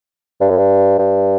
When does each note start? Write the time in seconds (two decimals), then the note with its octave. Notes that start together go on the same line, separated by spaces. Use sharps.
0.41 G2
0.50 F#2
0.58 G2
0.99 G2